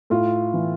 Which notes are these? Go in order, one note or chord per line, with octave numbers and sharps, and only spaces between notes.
A2 F4
E3